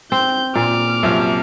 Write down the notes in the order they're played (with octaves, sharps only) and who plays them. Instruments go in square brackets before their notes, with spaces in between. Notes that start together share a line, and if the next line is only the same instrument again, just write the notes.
[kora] C4 [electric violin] G6
[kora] A#2 [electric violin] D6 F6
[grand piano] F#2 C3 F3